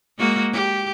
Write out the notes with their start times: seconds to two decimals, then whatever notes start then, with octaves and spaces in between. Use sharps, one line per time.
0.18 G#3 A#3 F#4
0.53 G4